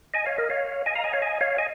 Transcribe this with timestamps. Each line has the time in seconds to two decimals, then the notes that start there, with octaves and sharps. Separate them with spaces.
0.14 D#5 G#5
0.26 C#5 F5
0.38 A#4 D#5
0.50 C#5 F5
0.86 D#5 G#5
0.95 F5 A#5
1.04 D#5 G#5
1.13 C#5 F5
1.22 D#5 G#5
1.41 C#5 F5
1.58 D#5 G#5